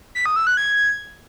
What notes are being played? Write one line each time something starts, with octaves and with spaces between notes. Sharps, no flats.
B6
D#6
E6
F#6
G#6